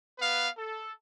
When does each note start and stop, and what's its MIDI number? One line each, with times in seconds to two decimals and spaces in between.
0.19 0.48 59
0.19 0.48 71
0.19 0.48 77
0.57 0.92 69